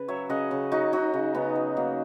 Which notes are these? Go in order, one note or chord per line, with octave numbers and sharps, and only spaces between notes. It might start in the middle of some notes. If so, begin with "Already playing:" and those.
Already playing: C#3 B4
F#3 C#5 E5
C#3 D#5 F#5
C#3
F#3 D#4 F#4
F#3 D#4 F#4
C#3
C#3 B3
F#3
F#3 A#3